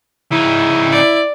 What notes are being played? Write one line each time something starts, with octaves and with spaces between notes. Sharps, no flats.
C#3 D#4 E4
D5